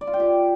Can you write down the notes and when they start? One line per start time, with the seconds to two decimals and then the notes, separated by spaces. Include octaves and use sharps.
0.01 D5
0.07 F4
0.13 G5
0.20 G4